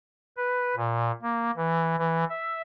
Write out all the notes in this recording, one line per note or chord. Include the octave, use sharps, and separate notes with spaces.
B4
A#2
A#3
E3
E3
E5